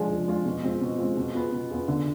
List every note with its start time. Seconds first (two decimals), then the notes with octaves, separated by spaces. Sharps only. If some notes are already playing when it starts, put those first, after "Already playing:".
Already playing: F3 G#3 D4 F4 G#4
0.10 F3
0.28 G#3 D4 F4 G#4
0.46 B2
0.63 G#3 C4 F4
0.81 B2
0.98 G#3 C4 F4
1.17 B2
1.34 B3 F4 G#4
1.52 B2
1.70 B3 F4 G#4
1.88 D3